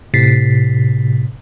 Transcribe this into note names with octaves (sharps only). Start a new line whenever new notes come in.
A2 C3 A6 B6 C7